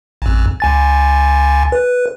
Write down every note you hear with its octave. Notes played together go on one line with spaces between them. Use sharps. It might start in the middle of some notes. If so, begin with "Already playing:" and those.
A1 F2
C#2 G#5 A6
B4